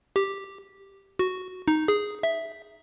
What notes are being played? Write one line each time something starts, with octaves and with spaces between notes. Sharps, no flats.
G4
F#4
D#4
G#4
E5